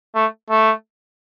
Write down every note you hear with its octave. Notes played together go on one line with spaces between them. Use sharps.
A3
A3